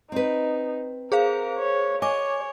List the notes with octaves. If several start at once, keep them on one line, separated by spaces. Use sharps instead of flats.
C4 D#4 B4
G#4 A#4 C5 F5
C#5
C#5 D#5 G#5 D6